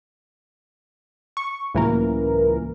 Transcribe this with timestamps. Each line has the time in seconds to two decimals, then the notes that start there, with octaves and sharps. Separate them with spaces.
1.37 C#6
1.74 C#2 A2 E3 F#3 A#3 A#4